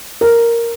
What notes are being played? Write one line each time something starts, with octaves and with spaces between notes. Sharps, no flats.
A#4